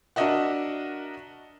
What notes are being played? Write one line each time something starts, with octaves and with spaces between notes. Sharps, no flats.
D4 F#4 A#4 D#5 E5 F#5